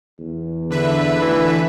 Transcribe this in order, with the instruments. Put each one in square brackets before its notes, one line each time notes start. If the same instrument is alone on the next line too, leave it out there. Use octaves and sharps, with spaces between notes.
[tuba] E2
[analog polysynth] D3 B4 E5
[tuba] D2 [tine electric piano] E3